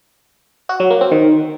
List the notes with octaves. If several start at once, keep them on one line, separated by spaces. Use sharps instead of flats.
F#4
F#3
A#3
C4
D#3